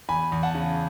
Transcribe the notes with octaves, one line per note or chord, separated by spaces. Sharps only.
E2 G#5 B5
E2
F#5 A5
C#3